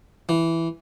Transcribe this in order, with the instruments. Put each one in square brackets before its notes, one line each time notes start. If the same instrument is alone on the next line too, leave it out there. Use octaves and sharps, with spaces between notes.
[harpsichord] E3